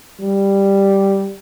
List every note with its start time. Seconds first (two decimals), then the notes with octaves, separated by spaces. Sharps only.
0.20 G3